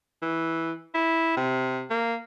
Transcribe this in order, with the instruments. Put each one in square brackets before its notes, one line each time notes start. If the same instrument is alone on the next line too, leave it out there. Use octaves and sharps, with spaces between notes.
[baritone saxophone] E3
E4
C3
A#3